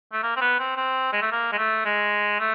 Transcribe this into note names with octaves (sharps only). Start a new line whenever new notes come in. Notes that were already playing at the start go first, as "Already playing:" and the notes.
A3
A#3
C4
B3
C4
C4
G#3
A3
A#3
G#3
A3
G#3
A3